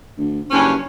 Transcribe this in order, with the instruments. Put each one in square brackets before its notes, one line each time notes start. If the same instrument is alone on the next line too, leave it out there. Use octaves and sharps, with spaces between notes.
[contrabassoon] D2
[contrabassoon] F#1 [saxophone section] G2 C#4